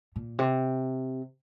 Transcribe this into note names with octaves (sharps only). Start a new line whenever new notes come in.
A#2
C3